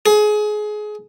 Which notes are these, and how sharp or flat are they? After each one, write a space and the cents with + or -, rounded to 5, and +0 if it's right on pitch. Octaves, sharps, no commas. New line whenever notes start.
G#4 +25